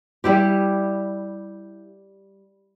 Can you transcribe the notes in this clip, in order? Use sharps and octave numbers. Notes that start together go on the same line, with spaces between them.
G3 E4 G4